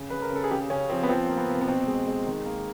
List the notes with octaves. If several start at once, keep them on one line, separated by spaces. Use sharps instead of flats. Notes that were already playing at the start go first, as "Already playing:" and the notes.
Already playing: C#3
C#3 B4
A#4
C#3 A4
G#4
C#3 G4
C#3 C#4
F3 C4
B3
F3 C4
A#3
B3
C3
B3
B2 C4
G#3
G#3
D#3
A#3